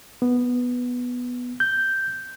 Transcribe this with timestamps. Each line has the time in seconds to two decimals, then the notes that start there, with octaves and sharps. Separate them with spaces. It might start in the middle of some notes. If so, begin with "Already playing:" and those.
0.22 B3
1.60 G6